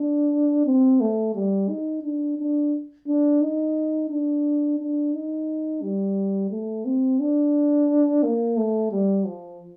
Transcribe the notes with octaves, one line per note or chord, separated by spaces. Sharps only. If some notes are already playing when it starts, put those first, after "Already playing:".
Already playing: D4
C4
A3
G3
D#4
D4
D4
D4
D#4
D4
D4
D#4
G3
A3
C4
D4
A#3
A3
G3
F3